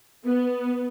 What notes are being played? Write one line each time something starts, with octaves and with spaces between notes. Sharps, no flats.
B3